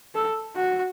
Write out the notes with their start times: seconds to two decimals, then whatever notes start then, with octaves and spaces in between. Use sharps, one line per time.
0.15 A4
0.56 F#4